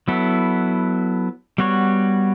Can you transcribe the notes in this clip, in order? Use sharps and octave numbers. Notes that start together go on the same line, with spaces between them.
F#3 B3 E4 A4
G3 B3 F#4 C#5